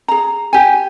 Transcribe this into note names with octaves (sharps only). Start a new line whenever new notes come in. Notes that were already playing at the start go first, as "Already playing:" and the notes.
G#4 A#5
G4 G#5